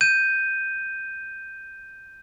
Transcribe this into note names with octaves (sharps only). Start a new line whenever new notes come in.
G6 D#7